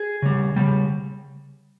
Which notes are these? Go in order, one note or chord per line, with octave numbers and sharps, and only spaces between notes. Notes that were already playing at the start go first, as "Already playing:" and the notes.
Already playing: G#4
C#3 G3
C#3 G3